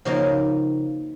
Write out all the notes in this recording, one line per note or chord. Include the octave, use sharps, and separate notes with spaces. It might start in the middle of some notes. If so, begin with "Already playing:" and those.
C#3 F3 A#3 D#4 F#4